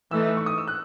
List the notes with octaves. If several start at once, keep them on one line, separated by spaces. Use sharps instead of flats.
E3 A3 D#4 E6
C#6
D#6
E6
F#6